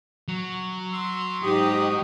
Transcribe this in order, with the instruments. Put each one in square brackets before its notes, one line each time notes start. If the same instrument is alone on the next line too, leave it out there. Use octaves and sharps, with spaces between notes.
[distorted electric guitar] F#3
[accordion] C6 E6
[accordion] G#2 D#6 [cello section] D#4 G4